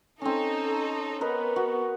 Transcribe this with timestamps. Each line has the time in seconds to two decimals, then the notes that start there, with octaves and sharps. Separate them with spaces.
0.22 C4 C#4 D#4 A4
1.21 B3 A#4 B4 D#5
1.56 F#4